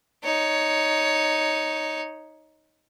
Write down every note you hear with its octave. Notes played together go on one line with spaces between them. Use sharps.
D#4 C#5